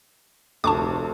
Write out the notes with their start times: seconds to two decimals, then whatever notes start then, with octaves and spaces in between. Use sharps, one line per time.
0.64 F1 D2 A5 C#6 D6